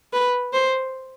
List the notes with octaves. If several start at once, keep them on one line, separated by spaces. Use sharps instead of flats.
B4
C5